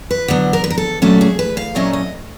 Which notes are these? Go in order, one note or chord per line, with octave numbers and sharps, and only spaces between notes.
B4
D3 F#3 B3
A#4
B4
A#4
A4
A#2 F#3 A3 C#4 A4
G#4
B4
F5
A#2 F#3 A3 C#4 D#5
D#5